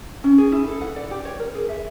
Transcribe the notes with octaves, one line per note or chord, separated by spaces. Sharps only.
C#4
G#4
E4
A4
F#5
D5
G4
C#5
A#4
G#4
E5